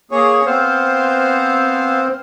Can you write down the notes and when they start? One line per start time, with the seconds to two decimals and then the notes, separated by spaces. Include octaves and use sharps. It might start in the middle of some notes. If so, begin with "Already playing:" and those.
0.11 A#3 G#4 C#5
0.46 B3 C4 C5 F5